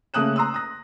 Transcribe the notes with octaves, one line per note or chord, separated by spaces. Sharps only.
C#3 A3 A#3 D#6 F#6 E7
A#5 C6 D#6 E6
D#6 A#6